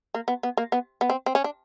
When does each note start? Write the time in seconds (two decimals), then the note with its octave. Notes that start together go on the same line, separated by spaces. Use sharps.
0.14 A#3
0.28 B3
0.43 B3
0.57 A#3
0.72 B3
1.01 B3
1.10 C4
1.26 C4
1.35 C#4
1.44 D4